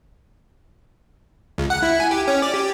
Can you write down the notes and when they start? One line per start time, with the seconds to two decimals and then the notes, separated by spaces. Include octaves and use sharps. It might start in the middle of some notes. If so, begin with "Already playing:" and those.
1.58 C#2
1.70 F#5
1.82 E4
2.00 G#5
2.11 G4
2.28 C#4
2.42 D5
2.54 G4